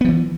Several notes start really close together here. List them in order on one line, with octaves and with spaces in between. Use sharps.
B3 F3 E3